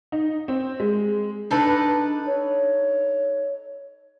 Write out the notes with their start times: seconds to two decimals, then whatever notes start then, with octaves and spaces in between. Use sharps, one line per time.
0.12 D#4
0.48 C4
0.80 G#3
1.51 D4 D#4 A4 B4
2.27 C#5